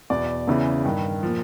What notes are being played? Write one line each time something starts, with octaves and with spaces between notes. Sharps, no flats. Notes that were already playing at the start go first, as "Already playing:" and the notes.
E2 B2 D5
E2 C#3 E3
G2 D#3
A#2 F3